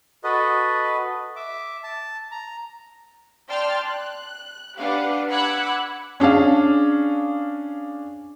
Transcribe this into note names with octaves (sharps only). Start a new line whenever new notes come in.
F#4 A4 B4 D#5
E5 D6
A5
A#5
D5 G5 A5 C6 F6
F#6
D4 G4 B4 F5 F#5
F#5 B5 D6 E6 F#6 G#6
C#4 D4 G#4 F5